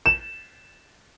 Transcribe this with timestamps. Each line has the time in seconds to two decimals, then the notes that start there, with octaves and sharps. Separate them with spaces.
0.06 E7